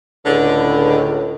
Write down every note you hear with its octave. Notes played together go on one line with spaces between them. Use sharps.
C#2 A2 D3